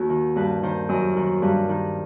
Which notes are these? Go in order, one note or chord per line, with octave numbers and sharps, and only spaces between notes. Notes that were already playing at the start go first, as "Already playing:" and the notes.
Already playing: D#2 F#4
D#3
G2 B4
D#3 C5
F#2 D#5
D#3
G2
D#3